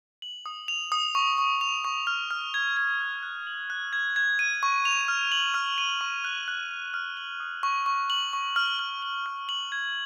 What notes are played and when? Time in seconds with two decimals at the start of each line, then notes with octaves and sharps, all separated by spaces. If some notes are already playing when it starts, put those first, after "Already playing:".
0.22 F#7
0.46 D#6
0.68 F7
0.92 D#6
1.15 C#6
1.38 C#6
1.61 F7
1.84 C#6
2.07 F6
2.31 F6
2.54 G#6
2.77 G#6
3.00 F#6
3.23 F#6
3.47 F#7
3.70 F#6
3.93 G#6
4.16 G#6
4.39 D#7
4.63 C#6
4.85 F7
5.08 F6
5.32 F#7
5.54 F6
5.78 D#7
6.01 C#6
6.24 F#6
6.48 F#6
6.71 F6
6.94 F6
7.17 F#7
7.40 D#6
7.63 C#6
7.86 C#6
8.10 F#7
8.33 C#6
8.56 F6
8.79 F6
9.02 F#7
9.26 F6
9.49 F#7
9.72 G#6